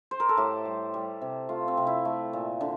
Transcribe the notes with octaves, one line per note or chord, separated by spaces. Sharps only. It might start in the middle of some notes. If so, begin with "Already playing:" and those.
C5
A#4
A4
A2 G4
G3
G3
C3
A3 F4
C4
C3
E4
A3
A#2
D3